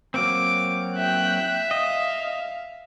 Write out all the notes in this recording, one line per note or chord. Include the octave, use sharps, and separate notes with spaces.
F#3 A#3 C4 D6
E5 G5 F#6
D#5 F5